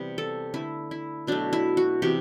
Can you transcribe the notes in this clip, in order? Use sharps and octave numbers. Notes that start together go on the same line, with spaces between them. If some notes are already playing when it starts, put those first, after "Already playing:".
Already playing: C3 E3 G3 B3
A4
D3 A3 E4
E4
B2 F#3 A3 D4
E4
F#4
C3 E3 B3 G4